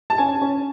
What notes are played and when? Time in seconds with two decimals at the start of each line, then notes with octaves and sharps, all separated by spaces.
0.10 A5
0.18 C#4 G#5
0.42 C#4